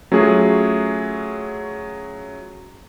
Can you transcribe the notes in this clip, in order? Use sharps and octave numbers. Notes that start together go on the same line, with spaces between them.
F#3 A3 C#4 F4 F#4 G#4